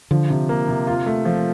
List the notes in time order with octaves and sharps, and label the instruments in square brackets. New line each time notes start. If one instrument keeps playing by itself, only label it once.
[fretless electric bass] D3 [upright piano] F3
[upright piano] C3
A#3
C3
F4
A3
F3